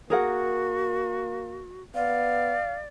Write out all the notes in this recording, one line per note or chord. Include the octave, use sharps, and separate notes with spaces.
A#3 F#4 G#4 A#4 F#5
B3 D5 F5